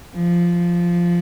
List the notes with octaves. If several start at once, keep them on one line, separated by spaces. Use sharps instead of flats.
F3